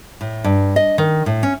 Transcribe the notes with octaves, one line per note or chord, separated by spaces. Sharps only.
A2
G2
D#5
D#3
A2
C#4